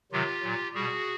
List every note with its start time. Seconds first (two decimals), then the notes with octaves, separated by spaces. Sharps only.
0.12 C3 D#3 F#3 F4 G4
0.43 A#2 F#3
0.74 B2 G3 F#4 G#4